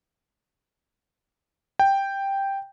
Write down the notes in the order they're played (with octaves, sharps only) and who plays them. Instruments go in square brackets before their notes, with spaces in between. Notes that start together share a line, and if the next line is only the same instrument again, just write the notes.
[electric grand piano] G5